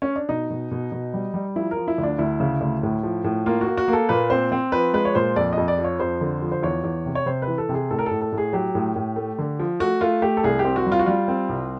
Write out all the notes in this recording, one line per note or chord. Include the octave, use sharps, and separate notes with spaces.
C#4
D4
B2 D#4
B2
B2
B2
G3
G3
F3 E4
A#4
F3
E4
D2
D4
D2 E4
C#3
D2
A2
F3
A2
A#3 F4
F#4
A#3
F#4
A#3
A4
A#2 B4
C4 C5
C4
F3 B4
G#3 B4
C#5
A#2 C5
F2 D5
F2 D#5
D5
F3
C#5
F2 C5
D3
F3
C5
E2 C#5
E2
C3
C#5
C3 C5
B4
E3
A4
C3
G#4
A2 A4
A#4
A4
A2
A4
A2
G#4
F#3 G4
A2
A2
A3
D3
F3
A3 F#4
A3 F4
A3 G4
A4
C2 G#4
G4
C4
F#4
G3
F4
F#4
G3 F4
C4
C2